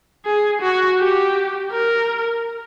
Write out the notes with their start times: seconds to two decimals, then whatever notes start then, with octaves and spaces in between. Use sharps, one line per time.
0.25 G#4
0.62 F#4
0.99 G4
1.72 A#4